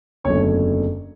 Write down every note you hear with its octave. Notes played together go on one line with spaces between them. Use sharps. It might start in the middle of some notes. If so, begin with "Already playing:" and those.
F#1 E2 D3 F#3 A3 C#5